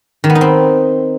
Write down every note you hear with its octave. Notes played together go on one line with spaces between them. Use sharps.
D#3
B3
D#4
C4